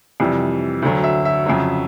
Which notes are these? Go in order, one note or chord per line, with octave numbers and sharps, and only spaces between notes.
F2 C3 E3 G3
D2 D3 F#3
E5
E5
F2 C#3 F#3